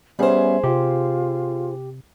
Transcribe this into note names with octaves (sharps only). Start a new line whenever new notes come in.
G3 B3 C#4 G#4 C5 E5
C3 F4 G4